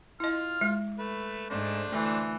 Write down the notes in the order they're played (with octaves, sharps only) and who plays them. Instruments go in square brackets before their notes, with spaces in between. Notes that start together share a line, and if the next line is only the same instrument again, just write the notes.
[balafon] E4 D#5 [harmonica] F4 F6
[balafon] G#3
[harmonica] A3 B4
[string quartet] G#2 [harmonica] A3 D4 C5
[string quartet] D2 E3